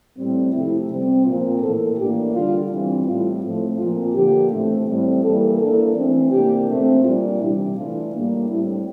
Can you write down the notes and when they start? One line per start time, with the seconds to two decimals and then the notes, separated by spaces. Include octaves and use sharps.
0.17 A2 G3 C4
0.53 C3 F3 A3 E4
0.89 C3 G3 C4
1.25 A#2 F3 C4 F4
1.61 A2 E3 A#3 A4
1.97 A2 E3 A#3 D4 G4
2.34 D3 G3 D4 F4
2.70 E3 G3 C4
3.06 A2 G3 C4 F4
3.42 A2 F3 A3 C4
3.78 A#2 F3 C4 F4
4.15 D3 F3 A#3 G4
4.51 A2 E3 A3 C4
4.87 A2 G3 C4
5.23 E3 G3 A#3 A4
5.59 E3 A#3 D4 A4
5.95 E3 A3 C4
6.32 C3 E3 A#3 D4 G4
6.68 A#2 A3 C4
7.03 A#2 G3 D4 F4
7.40 C3 E3 G3 D4 E4
7.76 E3 A3 D4 F4
8.12 A2 G3 A#3 D4
8.48 A2 G3 C4 E4